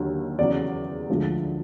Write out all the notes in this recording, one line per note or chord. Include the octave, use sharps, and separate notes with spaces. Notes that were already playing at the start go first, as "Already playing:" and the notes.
Already playing: D#2 D3 F#3
E2 C#3 F#3 D5
D2 D3 F3 G#3